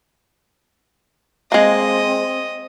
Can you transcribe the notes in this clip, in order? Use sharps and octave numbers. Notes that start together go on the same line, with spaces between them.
G#3 A#3 C4 D#5